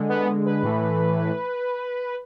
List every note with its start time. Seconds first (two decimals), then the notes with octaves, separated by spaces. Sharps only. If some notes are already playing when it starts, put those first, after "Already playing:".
Already playing: D3 G#3
0.09 B3
0.46 B4
0.63 A2 E3 A3